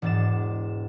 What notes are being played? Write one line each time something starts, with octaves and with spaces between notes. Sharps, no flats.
E1 G#2 D4 A6 E7